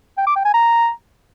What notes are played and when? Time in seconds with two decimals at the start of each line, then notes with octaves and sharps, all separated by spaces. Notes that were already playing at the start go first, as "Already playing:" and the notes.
0.17 G5
0.27 D6
0.36 G5
0.45 G#5
0.54 A#5